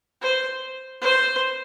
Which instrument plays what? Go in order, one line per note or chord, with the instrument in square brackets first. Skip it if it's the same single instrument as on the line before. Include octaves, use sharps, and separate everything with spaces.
[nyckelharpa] C5
C5